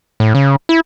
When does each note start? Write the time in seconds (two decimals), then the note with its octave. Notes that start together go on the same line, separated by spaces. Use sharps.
0.20 A2
0.35 C#3
0.69 E4